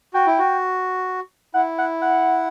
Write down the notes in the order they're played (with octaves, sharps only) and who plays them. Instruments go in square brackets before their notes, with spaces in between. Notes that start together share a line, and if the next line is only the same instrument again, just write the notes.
[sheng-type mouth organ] F#4 [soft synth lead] G5
[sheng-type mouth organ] E4
F#4
[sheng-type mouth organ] E4 [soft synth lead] F#5
[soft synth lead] F#5
F#5